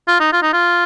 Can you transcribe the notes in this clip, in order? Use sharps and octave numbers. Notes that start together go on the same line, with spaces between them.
F4
D#4
F4
D#4
F4